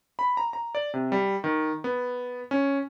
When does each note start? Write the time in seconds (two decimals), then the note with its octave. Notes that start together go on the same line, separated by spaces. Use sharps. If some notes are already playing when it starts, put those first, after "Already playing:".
0.19 B5
0.37 A#5
0.53 A#5
0.75 D5
0.94 C3
1.12 G3
1.44 D#3
1.84 B3
2.51 C#4